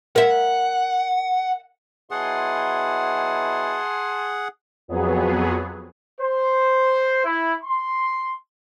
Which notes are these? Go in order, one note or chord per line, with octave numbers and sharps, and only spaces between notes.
A#4 E5 F#5
B2 F#3 E4 G#4 F#5 G#5 A5 C6
F2 F#3 B3 G#4
C5
E4
C6